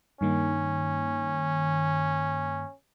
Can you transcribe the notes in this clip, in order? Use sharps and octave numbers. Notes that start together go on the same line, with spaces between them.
G2 D#3 A#3 C#4